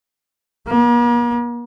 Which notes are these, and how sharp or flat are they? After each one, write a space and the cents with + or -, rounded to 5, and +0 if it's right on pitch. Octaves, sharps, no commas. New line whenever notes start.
A#3 +45